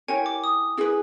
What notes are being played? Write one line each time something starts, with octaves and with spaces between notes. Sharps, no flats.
E4 G4 A#4 C#5 G#5
D6
D#6
E4 G#4 B4